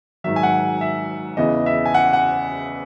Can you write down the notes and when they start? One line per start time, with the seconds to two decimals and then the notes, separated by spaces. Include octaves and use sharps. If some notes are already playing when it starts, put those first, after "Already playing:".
0.24 G#2 D#3 F#3 E5
0.36 G#5
0.43 F#5
0.81 E5
1.37 E2 C#3 E3 D#5
1.66 E5
1.85 G#5
1.94 F#5
2.13 F#5